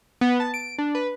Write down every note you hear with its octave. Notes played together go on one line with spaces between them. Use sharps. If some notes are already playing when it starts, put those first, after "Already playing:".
B3
A5
D7
D4
B4